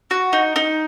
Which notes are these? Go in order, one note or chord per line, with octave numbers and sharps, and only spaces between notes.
F#4
D#4
D#4